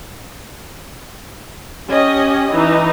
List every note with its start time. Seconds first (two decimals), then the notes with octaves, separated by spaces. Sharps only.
1.88 C#4 G4 D#5
2.53 E3 D#4